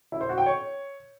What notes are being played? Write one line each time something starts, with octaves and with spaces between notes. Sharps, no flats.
E4
C5
F#4
G5
C#5